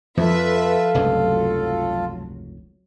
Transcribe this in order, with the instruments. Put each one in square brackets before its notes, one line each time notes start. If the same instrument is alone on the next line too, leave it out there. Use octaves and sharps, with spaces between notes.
[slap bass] F2 [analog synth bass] F3 [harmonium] F4 A4 [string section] B4 E5
[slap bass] F1 C#2 G2 [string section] F#3